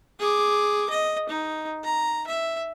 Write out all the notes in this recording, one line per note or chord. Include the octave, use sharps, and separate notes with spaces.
G#4 D6
D#5
D#4
A#5
E5